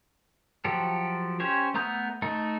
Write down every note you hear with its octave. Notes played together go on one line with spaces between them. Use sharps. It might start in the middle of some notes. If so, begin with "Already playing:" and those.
F3 F#3 G4 A4
C#4 G4 C5 C#5
A3 B3 A#5 D#6 G6
A3 D#4 A4